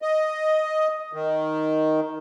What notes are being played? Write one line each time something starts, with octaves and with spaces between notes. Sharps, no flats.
D#5
D#3